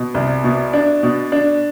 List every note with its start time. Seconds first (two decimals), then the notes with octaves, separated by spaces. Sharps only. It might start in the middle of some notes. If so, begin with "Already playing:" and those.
Already playing: B2
0.14 C2
0.44 B2
0.73 D4
1.03 B2
1.32 D4